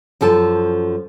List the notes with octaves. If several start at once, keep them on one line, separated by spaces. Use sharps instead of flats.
F#2 F3 A4 A5